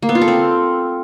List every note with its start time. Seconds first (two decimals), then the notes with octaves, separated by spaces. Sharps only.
0.02 A#3
0.09 B3
0.15 F4
0.21 A4
0.28 C4